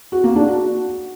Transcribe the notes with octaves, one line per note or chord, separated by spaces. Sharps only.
F#4
A#3
D4
F#4